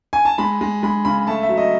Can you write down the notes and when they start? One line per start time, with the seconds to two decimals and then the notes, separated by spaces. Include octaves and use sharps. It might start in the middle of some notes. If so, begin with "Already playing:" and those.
0.13 G#5
0.25 A5
0.38 G#3 B5
0.61 G#3
0.83 G#3 B5
1.05 C#3 B5
1.27 A3 A5
1.43 E5
1.49 F#3
1.57 D#5